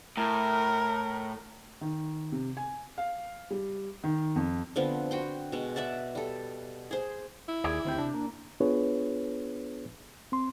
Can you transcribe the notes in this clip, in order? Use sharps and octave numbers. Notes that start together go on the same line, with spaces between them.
A2 A#4
D#3
C3
G#5
F5
G3
D#3
F2
D3 F3 B3 C4
F#4 G5 C6
B2 G#3
D5 E5 F#5 A5
G3 A4
G#4 C5
E4
D#2 G#4 D5
D2 D#3 C4 G4
C3 D4
A#3
B3 D4 F4 G#4 B4 C#5
C4 C6